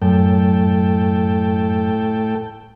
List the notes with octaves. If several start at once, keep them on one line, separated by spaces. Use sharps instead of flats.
F#2 A2 A4 G5